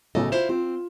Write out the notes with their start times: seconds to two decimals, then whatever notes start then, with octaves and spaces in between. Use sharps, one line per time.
0.15 B1 A2 C#3 A4 D#5
0.32 E4 F4 C5 E7
0.49 C4 F4